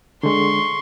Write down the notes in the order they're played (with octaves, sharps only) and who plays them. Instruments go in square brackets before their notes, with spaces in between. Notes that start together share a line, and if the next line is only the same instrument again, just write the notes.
[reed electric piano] D3 G#3 [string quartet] C6 C#6